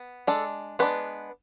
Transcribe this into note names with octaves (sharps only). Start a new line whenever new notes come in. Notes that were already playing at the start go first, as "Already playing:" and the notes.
Already playing: B3
G#3 D4 A4
G#3 B3 D4 B4